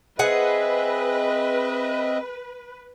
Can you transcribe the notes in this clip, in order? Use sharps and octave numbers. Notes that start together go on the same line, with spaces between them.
C4 G#4 B4 D#5 E5 F#5